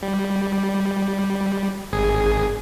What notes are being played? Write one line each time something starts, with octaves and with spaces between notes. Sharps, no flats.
G3
G#1 G#4